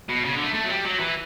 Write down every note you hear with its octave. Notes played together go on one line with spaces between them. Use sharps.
B2
C#3
D3
A3
A3
F#3
G3
F#3
E3